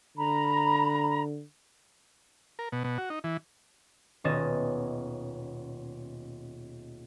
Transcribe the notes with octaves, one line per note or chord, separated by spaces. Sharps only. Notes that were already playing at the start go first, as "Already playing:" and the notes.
D3 A#5 B5
A#4
B2
B2
F#4
D#4
E3
D#1 B2 C#4 D#5 A6 E7